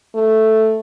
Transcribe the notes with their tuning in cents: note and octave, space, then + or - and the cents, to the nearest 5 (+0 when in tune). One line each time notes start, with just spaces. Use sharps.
A3 +0